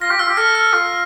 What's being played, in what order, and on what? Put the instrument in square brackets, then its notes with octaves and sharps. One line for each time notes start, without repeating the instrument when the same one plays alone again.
[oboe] F4 [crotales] A#6
[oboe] G4
[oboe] F4 [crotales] E6
[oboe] G4
[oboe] A4 [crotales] F6
[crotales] F6
[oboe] F4